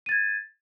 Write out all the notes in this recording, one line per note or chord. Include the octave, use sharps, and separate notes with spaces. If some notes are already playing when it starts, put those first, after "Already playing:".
G#6 A6 D#7